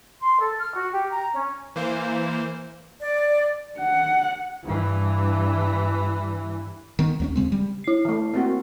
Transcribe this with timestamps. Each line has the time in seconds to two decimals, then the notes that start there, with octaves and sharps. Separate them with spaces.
0.21 C6
0.39 A4
0.58 F6
0.74 F#4
0.91 G4
1.09 A#5
1.33 C#4
1.76 E3 A#3 C5
3.00 D5
3.79 F#5
4.64 G2 E3
6.99 D#3 B3
7.20 D#2 G3 C#4
7.36 C#3 G#3 C4
7.52 G3
7.84 E4 C7
8.05 E3 A3
8.34 A#3 C4 F#4